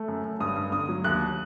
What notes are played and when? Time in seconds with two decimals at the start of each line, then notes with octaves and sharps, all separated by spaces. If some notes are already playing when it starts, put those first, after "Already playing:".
Already playing: A3
0.08 F#2
0.24 F#2
0.40 G2 D#6
0.57 G2
0.72 D3 D#6
0.89 F#3
1.04 D#2 F#6